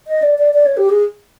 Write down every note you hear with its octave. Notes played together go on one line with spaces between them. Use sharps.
D#5
D5
D5
D5
C#5
G4
G#4